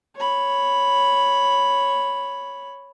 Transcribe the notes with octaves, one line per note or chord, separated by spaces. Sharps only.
C#5 B5